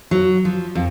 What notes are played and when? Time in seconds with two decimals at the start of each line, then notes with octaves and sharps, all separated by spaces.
0.11 F#3
0.45 F3
0.75 F2